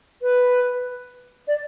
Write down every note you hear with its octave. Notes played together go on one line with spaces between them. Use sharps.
B4
D5